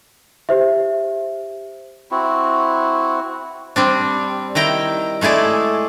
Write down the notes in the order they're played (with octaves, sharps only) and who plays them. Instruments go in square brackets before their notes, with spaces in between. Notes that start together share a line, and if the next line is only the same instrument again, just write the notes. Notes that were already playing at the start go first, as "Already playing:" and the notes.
[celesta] G4 C5 E5
[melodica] C4 E4 F#4
[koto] G3 C4 D4
D#3 E4 G5 A#5
G#3 A3 E4 G#4 D5